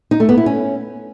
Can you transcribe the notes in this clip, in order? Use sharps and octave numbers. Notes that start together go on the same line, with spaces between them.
D#4
A3
B3
E4
C#4